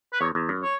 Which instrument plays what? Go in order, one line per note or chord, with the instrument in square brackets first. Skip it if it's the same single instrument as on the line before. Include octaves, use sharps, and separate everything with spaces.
[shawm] B4
[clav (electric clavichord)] E2 [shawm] C#5
[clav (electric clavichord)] E2
F#2
[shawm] C#5